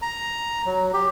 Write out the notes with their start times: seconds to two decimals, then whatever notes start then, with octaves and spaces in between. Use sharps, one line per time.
0.02 A#5
0.66 F#3
0.93 G4